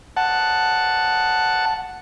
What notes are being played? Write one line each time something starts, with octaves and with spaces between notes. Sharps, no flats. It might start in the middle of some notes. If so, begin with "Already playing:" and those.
F#5 A5